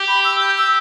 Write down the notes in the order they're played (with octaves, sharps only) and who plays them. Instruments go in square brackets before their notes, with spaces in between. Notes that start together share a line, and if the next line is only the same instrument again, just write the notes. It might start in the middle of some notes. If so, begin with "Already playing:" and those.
Already playing: [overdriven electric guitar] G4
[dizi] B5
E6
G6
E6